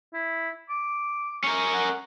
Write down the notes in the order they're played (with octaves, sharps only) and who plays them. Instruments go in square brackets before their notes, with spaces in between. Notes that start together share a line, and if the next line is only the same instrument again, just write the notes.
[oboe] E4
D6
[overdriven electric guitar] C#4 A#4
[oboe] F#5